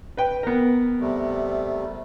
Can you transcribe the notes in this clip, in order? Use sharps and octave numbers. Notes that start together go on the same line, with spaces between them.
B4 G5
B3 A#4
C3 G3 A3